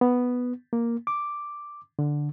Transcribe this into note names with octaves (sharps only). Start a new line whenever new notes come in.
B3
A#3
D6
D3